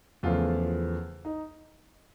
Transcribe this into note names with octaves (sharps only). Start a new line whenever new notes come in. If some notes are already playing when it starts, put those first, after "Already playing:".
E2 C#3 F3 A3 F4
D#4